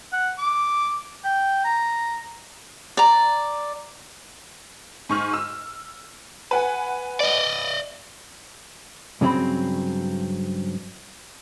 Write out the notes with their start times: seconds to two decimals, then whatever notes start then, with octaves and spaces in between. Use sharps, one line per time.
0.13 F#5
0.39 D6
1.25 G5
1.65 A#5
2.97 D5 A#5
5.09 G#2 C#6 F6
5.33 E6
6.51 B4 F#5 G#5
7.20 D5 D#5
9.21 G2 C#3 F#3 C4 C5 B5